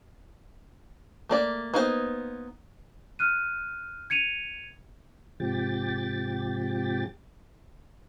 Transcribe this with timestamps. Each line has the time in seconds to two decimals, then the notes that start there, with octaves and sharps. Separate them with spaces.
1.29 A3 A#3 D5
1.74 A#3 B3 D#4 F#4 C5
3.19 F6 F#6 D#7
4.10 G#6 C#7 D#7 F7
5.40 G#2 C3 F3 G4 G5 A6